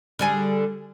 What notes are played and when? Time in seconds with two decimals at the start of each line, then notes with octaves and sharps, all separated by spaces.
0.19 D3 G3 G#4